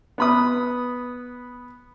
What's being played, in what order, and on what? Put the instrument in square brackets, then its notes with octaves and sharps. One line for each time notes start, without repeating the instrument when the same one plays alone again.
[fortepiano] B3 B5 D#6